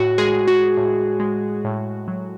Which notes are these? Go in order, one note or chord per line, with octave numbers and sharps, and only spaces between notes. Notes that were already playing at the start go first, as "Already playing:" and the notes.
Already playing: A2 F#4
G#3 G#4
A2
F#4
A2
G#3
A2
F#3